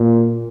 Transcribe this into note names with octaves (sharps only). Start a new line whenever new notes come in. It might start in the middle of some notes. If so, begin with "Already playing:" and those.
Already playing: A#2